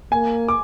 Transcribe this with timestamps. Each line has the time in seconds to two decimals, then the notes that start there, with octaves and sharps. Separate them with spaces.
0.12 A#3 G#5
0.49 D6